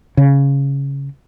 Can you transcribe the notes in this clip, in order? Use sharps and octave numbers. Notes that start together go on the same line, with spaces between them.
C#3